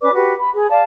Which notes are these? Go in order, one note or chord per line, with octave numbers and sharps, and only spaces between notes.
C#4 B4 D5 D6
F#4 G4 B4
B5
G#4
D5 F5 A5